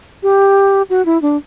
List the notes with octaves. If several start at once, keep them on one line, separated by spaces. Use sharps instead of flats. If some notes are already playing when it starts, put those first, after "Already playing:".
G4
F#4
E4
D4